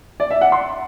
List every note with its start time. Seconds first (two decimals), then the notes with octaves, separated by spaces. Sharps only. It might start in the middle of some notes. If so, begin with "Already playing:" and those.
0.20 D5
0.31 E5
0.41 F#5
0.52 C6